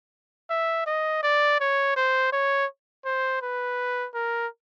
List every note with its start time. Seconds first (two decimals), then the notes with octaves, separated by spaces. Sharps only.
0.50 E5
0.87 D#5
1.23 D5
1.60 C#5
1.97 C5
2.33 C#5
3.05 C5
3.42 B4
4.15 A#4